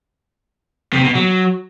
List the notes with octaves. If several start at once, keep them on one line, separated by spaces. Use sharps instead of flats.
C3
B2
F#3